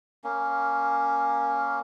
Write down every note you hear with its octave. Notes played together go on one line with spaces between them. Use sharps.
A#3 C#4